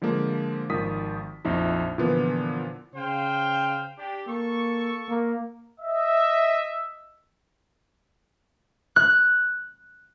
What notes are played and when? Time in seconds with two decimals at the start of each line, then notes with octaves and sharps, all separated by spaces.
0.02 D3 F3 G#3 A#3
0.70 G#1 D#3 F3 D#6 B6
1.45 A#1 F2 D#4 E4
1.98 A#2 D3 E3 F3 B3
2.95 C#3 C5 F5 G5
3.98 D4 G4
4.27 A#3 A4 C#6
5.09 A#3
5.80 D#5 E5
8.96 F#6